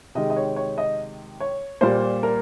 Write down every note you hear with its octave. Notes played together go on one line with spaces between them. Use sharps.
C3 D#3 G#3 D#5
D#5
C#5
C#5
D#5
C#5
A#2 G3 A#3 C5
A#4